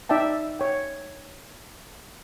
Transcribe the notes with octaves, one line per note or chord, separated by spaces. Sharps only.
D#4 D5 E5 G5 A5
C#5 G5